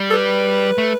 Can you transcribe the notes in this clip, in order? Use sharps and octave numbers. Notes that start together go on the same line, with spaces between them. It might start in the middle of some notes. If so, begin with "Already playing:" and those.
Already playing: G3
A4
B4
A3